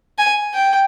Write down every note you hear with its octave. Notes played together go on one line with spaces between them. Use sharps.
G#5
G5